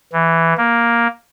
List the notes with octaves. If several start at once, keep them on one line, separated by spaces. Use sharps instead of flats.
E3
A#3